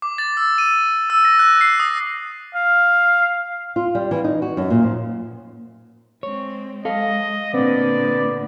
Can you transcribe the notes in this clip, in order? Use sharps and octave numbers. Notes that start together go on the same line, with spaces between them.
D6
A6
E6
D#7
E6
A#6
F#6
C7
D#6
F5
F4
G3
E3
D#4
F#4
F#2
A#2
F3
G#3 C4 C#5
G#3 A4 D#5 F5
A#2 D3 B3 C4 D5